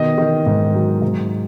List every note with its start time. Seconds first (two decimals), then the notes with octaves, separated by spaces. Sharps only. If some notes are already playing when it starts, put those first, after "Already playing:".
Already playing: B2 D#3 D#5
0.18 D#3
0.46 G#2
0.75 F#3
1.02 G#2